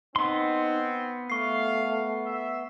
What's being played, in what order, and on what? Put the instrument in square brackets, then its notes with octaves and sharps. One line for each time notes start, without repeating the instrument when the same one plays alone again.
[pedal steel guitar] B3 C6 [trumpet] C4 [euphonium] D#4
[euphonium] A3 [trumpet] F5 [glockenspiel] C#6 C7
[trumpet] E5